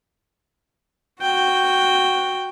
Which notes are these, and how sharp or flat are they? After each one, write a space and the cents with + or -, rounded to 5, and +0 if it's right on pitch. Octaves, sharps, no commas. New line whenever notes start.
F#4 +0 G5 +0